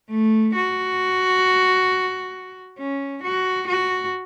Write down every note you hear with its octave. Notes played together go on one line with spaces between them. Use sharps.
A3
F#4
C#4
F#4
F#4